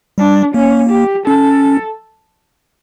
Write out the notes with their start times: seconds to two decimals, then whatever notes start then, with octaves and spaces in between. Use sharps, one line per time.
0.18 G3 D4
0.54 A#3 C#4
0.90 G4
1.27 C#4 A4